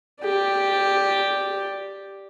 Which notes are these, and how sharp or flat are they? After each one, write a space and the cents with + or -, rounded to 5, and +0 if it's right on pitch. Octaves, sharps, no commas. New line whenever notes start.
G4 +0 D5 +0